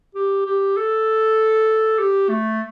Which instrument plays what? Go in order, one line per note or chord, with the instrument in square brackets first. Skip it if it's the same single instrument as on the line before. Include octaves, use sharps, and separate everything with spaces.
[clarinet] G4
G4
A4
G4
A3